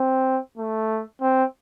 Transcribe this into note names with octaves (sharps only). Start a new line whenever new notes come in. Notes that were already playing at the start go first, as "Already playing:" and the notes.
Already playing: C4
A3
C4